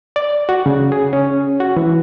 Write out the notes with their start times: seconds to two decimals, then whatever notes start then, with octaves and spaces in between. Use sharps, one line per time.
0.16 D5
0.49 F#4
0.66 C#3
0.92 G#4
1.13 C#4
1.60 F#4
1.77 E3